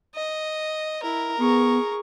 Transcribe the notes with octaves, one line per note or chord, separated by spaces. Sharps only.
D#5
E4 A#4
B3 G#4 C#6